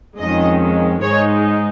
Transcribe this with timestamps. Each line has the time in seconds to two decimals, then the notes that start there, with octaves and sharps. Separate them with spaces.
0.20 F2 D#3 G#3 C#4 D#5
1.02 G#2 G#3 D#4 C#5